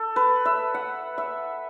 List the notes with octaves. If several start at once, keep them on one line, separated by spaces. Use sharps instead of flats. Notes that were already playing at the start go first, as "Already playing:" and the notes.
Already playing: A4
B4
E5
F#5
E5